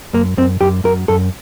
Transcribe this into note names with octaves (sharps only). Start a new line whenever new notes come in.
F#2 A#3
F#2 C4
F#2 G4
F#2 A#4
F#2 A4